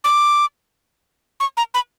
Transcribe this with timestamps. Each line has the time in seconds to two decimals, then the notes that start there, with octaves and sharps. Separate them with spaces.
0.04 D6
1.40 C#6
1.57 A#5
1.74 B5